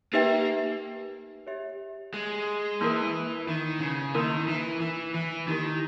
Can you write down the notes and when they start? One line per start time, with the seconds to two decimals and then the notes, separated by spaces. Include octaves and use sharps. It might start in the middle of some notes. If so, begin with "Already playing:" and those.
0.13 A#3 D#4 G4 B4 E5 G5
1.47 G4 C#5 E5
2.14 G#3
2.81 E3 A#3 E4 A#4
3.48 D#3
3.80 C#3
4.14 D#3 A#3 E4 A#4
4.48 E3
4.80 E3
5.15 E3
5.47 D#3 A#3 E4 G4 A#4